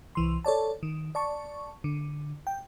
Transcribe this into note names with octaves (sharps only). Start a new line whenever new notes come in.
C2 E3 C6
A4 C#5 D5 A5
D#3
D5 A5 C#6
D3
G5